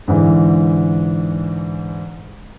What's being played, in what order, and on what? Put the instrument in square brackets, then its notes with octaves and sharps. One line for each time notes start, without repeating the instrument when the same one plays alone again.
[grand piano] G#2 D3 E3